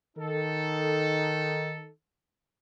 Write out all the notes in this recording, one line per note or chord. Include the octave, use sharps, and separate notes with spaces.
D#3 D#4 A4